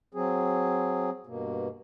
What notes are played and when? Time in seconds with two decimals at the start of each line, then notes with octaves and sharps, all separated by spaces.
0.14 F#3 C4 G#4
1.27 G2 B2 A#3